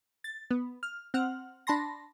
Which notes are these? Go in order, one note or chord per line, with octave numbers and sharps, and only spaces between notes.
A6
B3
F6
C4 F#5 F6
D4 A5 B5 C6 A#6